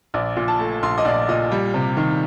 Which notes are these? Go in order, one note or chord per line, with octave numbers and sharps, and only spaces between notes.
A#1 D5
A#2
A5
A3
A#1 C6
D#5
A#1 D5
A#2 D#5
G3
C3
D#3